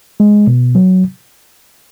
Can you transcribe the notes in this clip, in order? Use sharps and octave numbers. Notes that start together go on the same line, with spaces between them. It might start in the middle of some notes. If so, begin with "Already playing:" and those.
G#3
B2
F#3